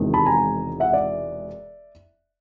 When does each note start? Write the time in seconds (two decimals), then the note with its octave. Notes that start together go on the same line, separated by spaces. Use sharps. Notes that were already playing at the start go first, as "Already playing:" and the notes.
Already playing: E1 E2 C3 D#3 G#3
0.14 A5 B5
0.26 G#5 A#5
0.80 E5 F#5
0.93 D5 E5